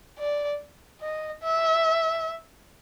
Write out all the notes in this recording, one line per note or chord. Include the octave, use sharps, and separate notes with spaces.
D5
D#5
E5